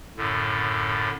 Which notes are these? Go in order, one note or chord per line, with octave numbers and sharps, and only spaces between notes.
F#2 A2 D3